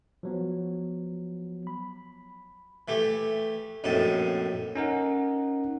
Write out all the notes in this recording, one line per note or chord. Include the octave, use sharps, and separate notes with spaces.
F3 F#3 B3
B5
E3 A3 G4
A#1 F#2 A2 C3 D#4 A5
C#4 D#4 A#4 F#5